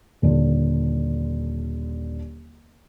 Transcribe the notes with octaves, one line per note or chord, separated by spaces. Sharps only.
D#1 D3